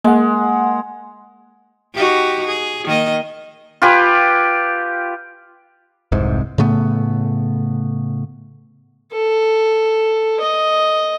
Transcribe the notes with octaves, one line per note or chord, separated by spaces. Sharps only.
G#3 A#3 F#5
D#4 F#4 G4
G#4
D#3 A#3 D#5
F4 G4 B4 G#5
F1 C2 G#2 C3
A2 C#3 A3 B3
A4
D#5